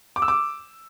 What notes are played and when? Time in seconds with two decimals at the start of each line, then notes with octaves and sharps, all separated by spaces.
0.16 D6
0.22 E6
0.28 D6